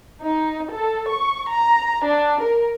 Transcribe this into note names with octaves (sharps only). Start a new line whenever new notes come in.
D#4
A4
C#6
A#5
D4
A#4